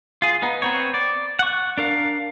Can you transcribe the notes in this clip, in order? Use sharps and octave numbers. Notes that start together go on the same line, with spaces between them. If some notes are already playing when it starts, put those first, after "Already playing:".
F4 G#4
B3 D#4
B3 C4 C#5
D5
F#5 C#6
D4 A#4 F5